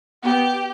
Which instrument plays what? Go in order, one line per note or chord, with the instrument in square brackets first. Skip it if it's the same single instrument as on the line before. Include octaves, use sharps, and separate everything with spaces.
[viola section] B3 [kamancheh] G4